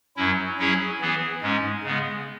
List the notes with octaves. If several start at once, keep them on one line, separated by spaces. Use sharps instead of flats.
F#2 F#3 C#4 E4
F#3 C#4 E4 G#4 C#5
E3 B3 G#4
G#2 G#3 C#4
C#3 G#3 B3